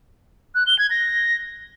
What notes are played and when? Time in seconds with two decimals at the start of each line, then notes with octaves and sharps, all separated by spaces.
0.55 F#6
0.67 G7
0.79 G#6
0.90 A#6